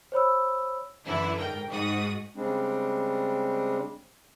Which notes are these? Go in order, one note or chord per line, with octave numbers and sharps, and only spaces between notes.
C5 C#5 B5 E6
F#2 D3 E3 E4
G#2 A#4 G5
G#2 F#4 D#6
C#3 G3 G#3 C4 D4